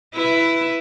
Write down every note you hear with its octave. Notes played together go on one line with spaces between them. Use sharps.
E4 B4